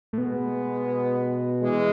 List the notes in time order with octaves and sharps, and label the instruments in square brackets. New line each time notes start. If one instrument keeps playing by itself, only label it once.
[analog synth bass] A2
[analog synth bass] B2 [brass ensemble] G#3 B3
[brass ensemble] E3 G#3